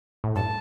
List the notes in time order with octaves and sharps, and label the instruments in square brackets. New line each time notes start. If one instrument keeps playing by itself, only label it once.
[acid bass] A2
[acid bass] G2 [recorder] A5